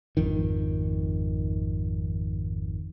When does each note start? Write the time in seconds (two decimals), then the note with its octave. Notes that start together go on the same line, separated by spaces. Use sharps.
0.17 G#1 F2 D#3